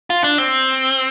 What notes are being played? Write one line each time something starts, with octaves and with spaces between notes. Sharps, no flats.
F4
D4
C4